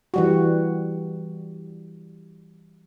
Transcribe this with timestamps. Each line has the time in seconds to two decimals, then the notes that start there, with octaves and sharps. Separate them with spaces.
0.14 E3 G3 F#4